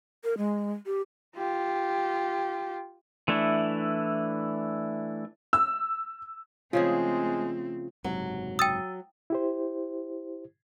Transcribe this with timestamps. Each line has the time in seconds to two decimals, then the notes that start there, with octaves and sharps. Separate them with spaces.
0.24 A#4
0.38 G#3
0.86 G4
1.37 F4 G4
3.28 E3 A3 D4 E4
5.53 E6
6.73 C#3 F3 G#3 A3 C4 F4 G#4
8.04 F#1 G#2 C3 F#3
8.59 G5 D#6 E6 A6 D#7
9.30 E4 G4 C5